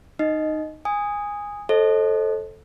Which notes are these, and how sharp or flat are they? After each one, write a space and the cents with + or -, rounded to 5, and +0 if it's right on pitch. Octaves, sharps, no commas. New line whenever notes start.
D#4 -15 D#5 +0
G#5 -15 D#6 +0
A4 +0 C5 +35 D#5 +0